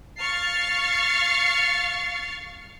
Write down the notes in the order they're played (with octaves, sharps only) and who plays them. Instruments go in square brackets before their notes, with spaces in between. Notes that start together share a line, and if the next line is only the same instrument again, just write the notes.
[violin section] F5 C#6 F6 A6 C7